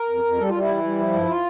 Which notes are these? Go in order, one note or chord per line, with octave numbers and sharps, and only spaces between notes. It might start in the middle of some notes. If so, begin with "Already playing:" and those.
Already playing: A#4
F2
F2
G3 A4
F4
G3 E4
E3
G3
F3
G2
F4